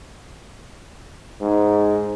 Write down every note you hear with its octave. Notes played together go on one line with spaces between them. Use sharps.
G#2